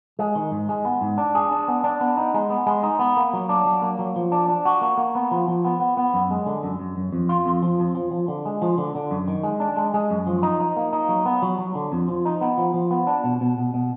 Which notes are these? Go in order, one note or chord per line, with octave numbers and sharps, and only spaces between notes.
G#3
D#3
G#2
G#3
B3
G#2
D4
G#4
D4
B3
D4
B3
D#4
G#3
B3
G#3
D#4
B3
A#3
F#3
D4
F#3
A#3
F#3
F3
D4
D4
F#4
A#3
A#3
B3
F3
F3
B3
B3
B3
F#2
G#3
D3
F#2
F#2
F#2
F2
F4
F2
F3
F2
F3
F3
D3
G#3
F3
D3
D3
F#2
D#3
G#3
D4
G#3
G#3
F#2
F3
D#4
D#4
A#3
D#4
F#3
B3
F#3
F#3
D3
F2
F3
D#4
B3
F3
F3
B3
D4
B2
B2
B2
B2